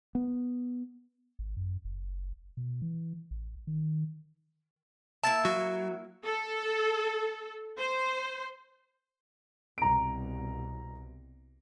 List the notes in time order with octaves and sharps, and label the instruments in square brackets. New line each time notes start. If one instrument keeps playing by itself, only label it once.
[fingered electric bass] B3
[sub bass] G#1
F#2
F#1
B2
E3
A1
D#3
[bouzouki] A#3 E4 E5 [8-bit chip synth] A5 A6
[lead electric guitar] F#3 [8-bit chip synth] F#4
[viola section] A4
C5
[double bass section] C2 B2 [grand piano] A#5 D7